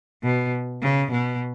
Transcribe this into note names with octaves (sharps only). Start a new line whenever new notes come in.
B2
C#3
B2